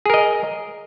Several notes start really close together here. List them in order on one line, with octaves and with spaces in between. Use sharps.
G#4 A#4 D#5